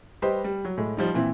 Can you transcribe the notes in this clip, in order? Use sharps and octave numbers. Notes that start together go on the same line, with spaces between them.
G3 G4 B4 C5 D#5
G3
F#3
A2 G#3
F3 G3 D#4
A#2 E3 C4